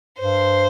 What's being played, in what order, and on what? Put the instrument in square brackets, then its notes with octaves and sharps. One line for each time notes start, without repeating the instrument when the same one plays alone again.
[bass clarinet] G2 [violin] C5